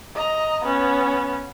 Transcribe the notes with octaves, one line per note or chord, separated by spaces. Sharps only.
D#5 A#5
B3 C#4